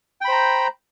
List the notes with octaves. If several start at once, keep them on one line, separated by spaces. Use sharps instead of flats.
C5 G5 A#5 B5